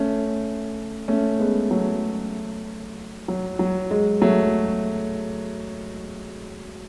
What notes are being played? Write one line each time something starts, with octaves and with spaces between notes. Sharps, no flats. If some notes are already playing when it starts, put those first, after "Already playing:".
Already playing: A3 C#4
A3 C#4
G#3 B3
F#3 A3
F#3
F#3
G#3
F#3 A3